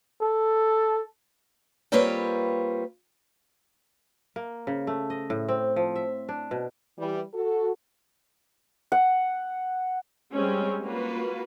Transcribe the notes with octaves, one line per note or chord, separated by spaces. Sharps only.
A4
G3 A#3 C4 F4 B4 C#5
A#3
C#3
A3
D#5
A2
C4
F3
E5
D4
B2
E3 G3
F#4 A4
F#5
G3 G#3 C4 C#4
A#3 F4 F#4 B4